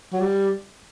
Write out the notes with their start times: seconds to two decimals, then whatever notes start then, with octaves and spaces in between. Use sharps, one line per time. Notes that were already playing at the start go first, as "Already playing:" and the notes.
0.13 F#3
0.21 G3